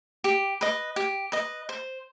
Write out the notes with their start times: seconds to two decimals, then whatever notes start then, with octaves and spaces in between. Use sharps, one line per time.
0.24 G4
0.61 B4 D#5
0.96 G4
1.32 B4 D#5
1.69 C5